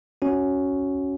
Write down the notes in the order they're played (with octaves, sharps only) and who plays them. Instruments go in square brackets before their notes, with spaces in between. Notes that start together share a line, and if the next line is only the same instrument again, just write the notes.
[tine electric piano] C#4 F#4